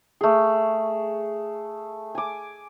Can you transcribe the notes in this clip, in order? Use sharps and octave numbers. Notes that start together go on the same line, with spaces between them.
A3 G#4
G#5 D6